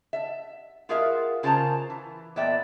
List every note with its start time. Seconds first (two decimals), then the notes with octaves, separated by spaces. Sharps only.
0.13 E5
0.89 F4 F#4 G#4 A#4 E5 F5
1.43 C#3 F4 A#4 C5 A5 A#5
1.90 E3
2.36 A#2 B3 D5 E5 G5